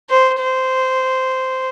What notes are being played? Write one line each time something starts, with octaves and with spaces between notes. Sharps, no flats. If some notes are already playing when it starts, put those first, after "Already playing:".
C5
C5